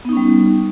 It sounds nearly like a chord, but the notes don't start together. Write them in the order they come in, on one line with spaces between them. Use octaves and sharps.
B3 D#4 C#4 G3